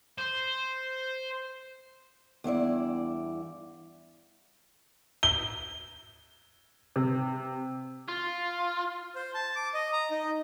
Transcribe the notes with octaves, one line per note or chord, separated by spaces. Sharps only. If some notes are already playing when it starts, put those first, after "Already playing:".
C5
E2 G2 E4 D5
G7
C3
F4
C5
A5
D6
D#5
A#5
D#4